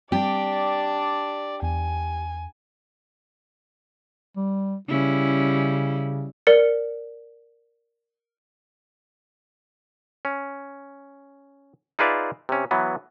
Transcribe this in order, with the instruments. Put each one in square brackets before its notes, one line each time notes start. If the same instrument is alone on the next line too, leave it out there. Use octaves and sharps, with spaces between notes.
[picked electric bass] G3 C4 [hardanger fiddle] D4 [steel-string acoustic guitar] G4 [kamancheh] D5
[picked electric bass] E2 [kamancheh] G#5
[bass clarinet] G3
[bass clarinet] C#3 [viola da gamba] G3 C#4 E4
[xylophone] A#4 D5 C#7
[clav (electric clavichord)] C#4
D#4 F4 G#4 B4 D5 E5
C3 C#4
E3 F#3 B3